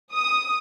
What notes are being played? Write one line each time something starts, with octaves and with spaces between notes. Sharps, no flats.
D#6